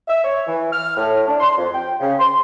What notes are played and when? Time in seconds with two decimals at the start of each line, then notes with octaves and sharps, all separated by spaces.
0.08 E5
0.24 C#5
0.47 E3
0.72 F6
0.97 A2
1.28 D4
1.39 C6
1.58 F2
1.74 G5
2.00 C#3
2.19 C6